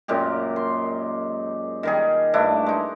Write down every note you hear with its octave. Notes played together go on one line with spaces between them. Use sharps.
F#2 A#2 G#3 G4
C6
D#3 G3 G#4
G2 A3 D4 E4
G#3 D#4